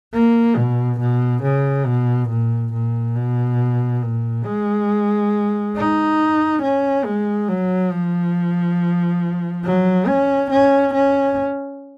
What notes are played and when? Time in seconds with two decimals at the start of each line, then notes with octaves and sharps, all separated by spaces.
0.13 A#3
0.57 B2
1.00 B2
1.43 C#3
1.86 B2
2.29 A#2
2.73 A#2
3.16 B2
4.02 A#2
4.45 G#3
5.76 D#4
6.62 C#4
7.05 G#3
7.48 F#3
7.91 F3
9.64 F#3
10.08 C#4
10.51 C#4
10.94 C#4